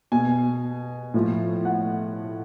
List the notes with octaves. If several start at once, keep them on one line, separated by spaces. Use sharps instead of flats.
B2 G#5
A2 F3
F#5